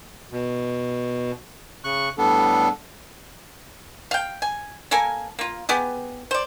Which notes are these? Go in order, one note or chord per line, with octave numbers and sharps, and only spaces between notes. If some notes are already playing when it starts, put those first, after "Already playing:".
B2
C#3 C#6 F#6
A2 G3 B3 D4 A4
F5 G5
G#5
A#3 A4 A#4 G#5
A#3 F4
B3 G4 G#4
C5 D5